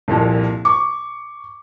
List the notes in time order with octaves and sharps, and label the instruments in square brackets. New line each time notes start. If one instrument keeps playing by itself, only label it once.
[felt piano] C2 F2 A#2
[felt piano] C#6 [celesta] D6